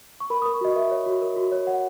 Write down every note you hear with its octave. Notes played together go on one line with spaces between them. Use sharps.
C#6
A#4 B5
D#6
A#4
C#6
F#4 D#5
A#4 E5
C#5
F#4
A#4
F#4
C#5
C#5 F#5